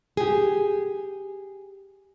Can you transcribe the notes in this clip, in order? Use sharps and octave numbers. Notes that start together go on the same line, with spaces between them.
G4 G#4